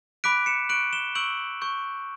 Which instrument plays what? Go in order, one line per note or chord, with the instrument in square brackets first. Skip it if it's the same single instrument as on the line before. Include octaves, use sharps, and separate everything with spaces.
[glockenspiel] B5 D6 F#6 B6 D7
C#7 E7
C#6 F#6 D7 F#7
E7 G7
C#6 E6 G6 D7 F#7
C#6 G6